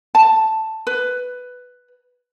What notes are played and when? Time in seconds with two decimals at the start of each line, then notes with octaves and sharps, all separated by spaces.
0.15 A5
0.87 B4